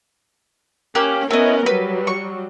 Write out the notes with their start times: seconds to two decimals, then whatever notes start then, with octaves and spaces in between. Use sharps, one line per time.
0.95 A#3 C#4 G4 F#6
1.31 B3 C#4 E4 A#4 D#5
1.66 F#3 G3 B4
2.07 C#6